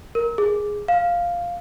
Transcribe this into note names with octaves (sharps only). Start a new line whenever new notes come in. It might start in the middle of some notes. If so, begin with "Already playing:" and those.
A#4
G#4
F5